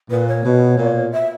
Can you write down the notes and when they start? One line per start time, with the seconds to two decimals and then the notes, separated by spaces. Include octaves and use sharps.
0.10 A#2 B4
0.28 C#5
0.45 B2
0.78 A#2
1.12 E5